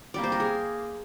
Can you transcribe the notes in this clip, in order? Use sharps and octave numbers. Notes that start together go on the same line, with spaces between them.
C3 G3 A#3 D5
C5
A#4
G#4